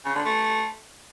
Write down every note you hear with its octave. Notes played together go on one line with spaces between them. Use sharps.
C#3
D3
A3